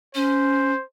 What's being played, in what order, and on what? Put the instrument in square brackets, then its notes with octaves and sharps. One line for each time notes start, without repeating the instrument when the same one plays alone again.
[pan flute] C#4 [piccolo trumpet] C5